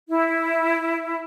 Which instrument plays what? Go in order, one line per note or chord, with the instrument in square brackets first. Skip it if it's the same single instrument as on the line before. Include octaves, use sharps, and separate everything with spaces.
[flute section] E4